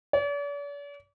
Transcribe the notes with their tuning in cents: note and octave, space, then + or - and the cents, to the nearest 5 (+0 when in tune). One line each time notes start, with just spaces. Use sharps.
D5 -45